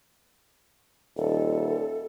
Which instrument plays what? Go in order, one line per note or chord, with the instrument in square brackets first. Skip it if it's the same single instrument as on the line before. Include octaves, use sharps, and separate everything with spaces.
[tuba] D#1 [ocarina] A4